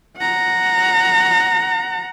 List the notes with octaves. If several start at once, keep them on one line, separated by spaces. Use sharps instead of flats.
F#5 A#5